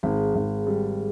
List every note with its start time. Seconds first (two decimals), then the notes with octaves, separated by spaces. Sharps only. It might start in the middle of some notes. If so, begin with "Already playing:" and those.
0.03 G#1 G#4
0.35 G#1
0.67 G3